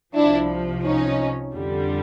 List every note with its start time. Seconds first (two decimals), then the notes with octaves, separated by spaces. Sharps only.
0.14 C2 C3 F3 D4 E4
0.84 C#4 D#4
1.54 F2 D3 G3